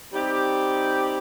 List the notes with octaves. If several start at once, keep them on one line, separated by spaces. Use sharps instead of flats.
G3 C4 D#4 G4